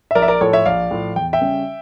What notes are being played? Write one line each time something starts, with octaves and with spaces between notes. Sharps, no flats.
E5
A#1 A#4 D5
E5
A#4 D5
A2 F3 A4 C#5
C#5 E5
A#1 D5 F5
A2 F3
E2 G5
E5 G5
C#3 G3 C#4